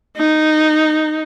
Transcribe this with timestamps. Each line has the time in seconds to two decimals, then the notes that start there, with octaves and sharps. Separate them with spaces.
0.17 D#4